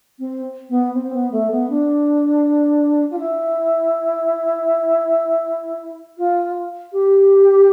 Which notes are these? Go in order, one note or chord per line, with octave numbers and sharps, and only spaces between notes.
C4
B3
C4
B3
A3
B3
D4
F4
E4
F4
G4